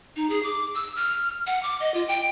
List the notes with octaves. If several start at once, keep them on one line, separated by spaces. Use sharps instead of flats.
D#4
G#4
D6
E6
F6
F#5
D6
D#5
F4
G5